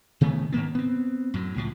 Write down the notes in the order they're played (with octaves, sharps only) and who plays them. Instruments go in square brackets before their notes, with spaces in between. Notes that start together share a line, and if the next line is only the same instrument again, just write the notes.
[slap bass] C3 D#3 A3 B3
G#2 D#3 A#3 B3
B3 C4
F#2 A2 F#3
C#2 A2 F3